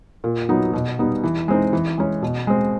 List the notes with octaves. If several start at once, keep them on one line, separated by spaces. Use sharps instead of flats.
A#2
F#3 B3 D#4
B2
G3 B3 D#4
E3
G#3 C4 D#4
E3
G#3 C#4
B2
G#3 C4